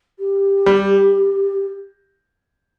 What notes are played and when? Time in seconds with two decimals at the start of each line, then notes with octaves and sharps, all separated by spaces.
0.19 G4
0.66 G3